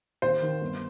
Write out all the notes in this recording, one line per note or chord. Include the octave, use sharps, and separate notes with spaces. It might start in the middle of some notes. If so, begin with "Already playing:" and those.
D#2 C5
D#3
G1